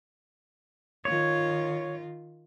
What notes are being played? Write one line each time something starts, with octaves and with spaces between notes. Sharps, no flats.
D#3 F4 C#5